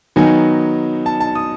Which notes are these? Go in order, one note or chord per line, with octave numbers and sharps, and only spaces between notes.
D#3 F#3 B3 D#4 G#5
A5
A5
D#6